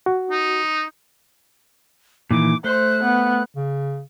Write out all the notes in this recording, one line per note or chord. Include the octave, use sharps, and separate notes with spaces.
F#4
D#4
A#2 D#3 E3 D6
A3 C5 F#6
B3
C#3